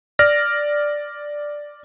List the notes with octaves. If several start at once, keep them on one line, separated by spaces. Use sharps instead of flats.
D5 F6 A#6